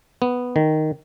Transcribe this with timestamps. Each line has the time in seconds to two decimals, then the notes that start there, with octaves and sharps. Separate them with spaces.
0.22 B3
0.56 D#3